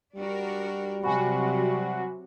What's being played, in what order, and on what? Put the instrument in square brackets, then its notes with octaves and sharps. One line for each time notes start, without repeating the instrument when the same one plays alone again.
[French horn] G3 [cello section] D4 F#4 A#4
[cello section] C3 F#3 [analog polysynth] F#4 [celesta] G#5 B5